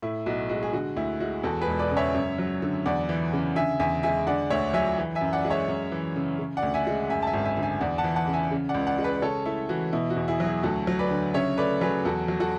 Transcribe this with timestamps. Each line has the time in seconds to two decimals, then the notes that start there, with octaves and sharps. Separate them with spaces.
0.02 A2 E4
0.26 B1 F#4
0.49 G#3 F#4
0.63 G#4
0.73 D3 F#4
0.96 D2 E4
1.20 G#3 F#4
1.43 E2 F#4 A4
1.61 G#4 B4
1.67 E1
1.79 B4 D5
1.91 C#3
1.97 C#5 E5
2.15 F#2
2.38 F#3
2.62 D3
2.86 E2 D5 F#5
3.09 E3
3.33 C#3
3.56 D3 E5 G#5
3.80 E2 E5 G#5
4.03 G#3 E5 G#5
4.27 D3 D5 F#5
4.50 D2 C#5 E5
4.74 F#3 E5 G#5
4.98 E3
5.15 E5 G#5
5.21 F#2
5.33 D5 F#5
5.45 G#3
5.50 C#5 E5
5.68 F#2
5.91 E3
6.16 C#3
6.39 C#3
6.57 D5 F#5
6.63 D2
6.74 E5 G#5
6.87 G#3
7.10 F#2 E5 G#5
7.22 A5
7.27 E5 G#5
7.34 G#1
7.45 E5 G#5
7.57 D3
7.63 E5 G#5
7.81 E2 D5 F#5
7.98 F#5 A5
8.04 E3
8.16 F#5 A5
8.28 C#3
8.33 E5 G#5
8.51 C#3
8.69 D5 F#5
8.75 C#2
8.87 D5 F#5
8.98 G#3
9.04 B4 D5
9.22 C#3 A4 C#5
9.46 A3 E4
9.69 E3 F#4
9.93 B2 E4
10.10 F#4
10.16 E2
10.28 E4 G#4
10.40 F#3
10.46 E4 G#4
10.63 D2 F#4 A4
10.87 F#3
10.99 B4 D5
11.11 D3
11.34 C#3 C#5 E5
11.58 A3 B4 D5
11.81 F#3 G#4 B4
12.05 E2 F#4 A4
12.28 F#3
12.40 F#4 A4